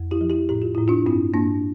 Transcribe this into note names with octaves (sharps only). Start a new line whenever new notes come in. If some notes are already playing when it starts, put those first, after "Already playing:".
Already playing: F2
E4 G4
F3
E4 G4
A2 G4
F4
A2 E4
D4 F4
G2 C4 E4
G2 A#3 D4